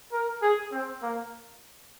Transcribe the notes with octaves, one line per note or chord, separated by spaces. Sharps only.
A#4
G#4
C4
A#3